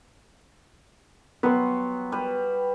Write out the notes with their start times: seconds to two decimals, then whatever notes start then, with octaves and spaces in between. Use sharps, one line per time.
1.43 F#3 G3 B3 C6
2.12 G3 B4